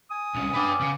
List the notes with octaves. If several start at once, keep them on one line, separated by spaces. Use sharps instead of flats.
G#5 D#6
C2 C#3
B3 C#4 D4 G4 B4
C#3